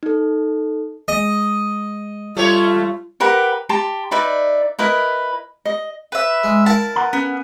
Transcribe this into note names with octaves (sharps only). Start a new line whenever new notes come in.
D#4 A4
G#3 D#5
G3 A3 F4 C#5
G4 A#4 B4 F#5
G4 A5 A#5 C6
D#4 B4 D5 E5
E4 A#4 B4 D#5
D#5
B4 E5
G#3
E4 A#4 F5 A5
B4 F#5 A#5
B3 C#4